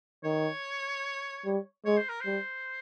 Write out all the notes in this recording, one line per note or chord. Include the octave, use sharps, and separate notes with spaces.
D#3 C#5
G3
G#3 C#5
C5
A#4
G3 C5